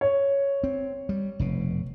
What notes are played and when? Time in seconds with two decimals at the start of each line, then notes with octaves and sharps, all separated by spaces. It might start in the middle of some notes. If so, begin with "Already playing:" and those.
0.01 C#5
0.64 C4
1.09 G3
1.39 F1 B2